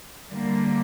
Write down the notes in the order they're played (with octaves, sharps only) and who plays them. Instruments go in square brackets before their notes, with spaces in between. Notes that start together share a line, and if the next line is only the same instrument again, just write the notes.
[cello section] D3 G3 A#3